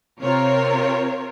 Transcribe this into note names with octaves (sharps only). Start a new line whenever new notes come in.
C3 C4 F4 A#4 C#5